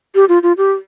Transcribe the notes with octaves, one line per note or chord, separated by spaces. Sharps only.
G4
F4
F4
G4